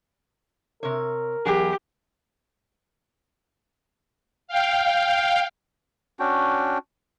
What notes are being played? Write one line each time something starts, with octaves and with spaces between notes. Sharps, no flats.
C3 A#4 C#5
E2 F#3 G4 G#4
F5 G5
C#4 D4 F#4 G5